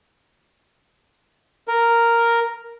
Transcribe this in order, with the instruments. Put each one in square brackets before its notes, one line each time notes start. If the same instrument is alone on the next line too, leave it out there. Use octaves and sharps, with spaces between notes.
[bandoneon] A#4